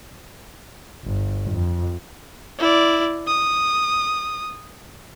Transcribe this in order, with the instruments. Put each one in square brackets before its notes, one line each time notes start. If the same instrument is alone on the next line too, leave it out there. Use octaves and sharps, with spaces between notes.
[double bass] G1
F2
[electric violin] E4 D5
D#6